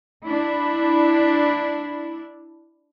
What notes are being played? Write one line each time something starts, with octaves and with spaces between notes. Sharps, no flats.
D4 E4